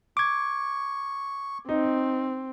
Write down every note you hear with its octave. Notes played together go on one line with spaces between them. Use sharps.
C#6 D6 G#6
C4 D#4